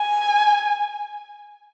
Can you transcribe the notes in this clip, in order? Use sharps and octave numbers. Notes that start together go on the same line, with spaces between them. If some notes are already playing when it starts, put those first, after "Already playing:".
Already playing: G#5